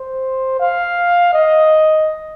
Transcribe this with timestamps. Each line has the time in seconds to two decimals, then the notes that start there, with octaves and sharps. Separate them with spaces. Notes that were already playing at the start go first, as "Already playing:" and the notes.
Already playing: C5
0.60 F5
1.33 D#5